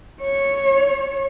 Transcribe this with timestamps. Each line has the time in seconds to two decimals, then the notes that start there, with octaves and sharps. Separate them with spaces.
0.22 C#5